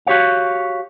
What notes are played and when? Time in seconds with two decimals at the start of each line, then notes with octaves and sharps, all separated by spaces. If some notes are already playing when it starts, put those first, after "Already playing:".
0.07 F#4 G4 C#5 F5